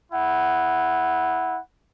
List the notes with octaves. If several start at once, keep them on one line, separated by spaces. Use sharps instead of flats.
E4 F#5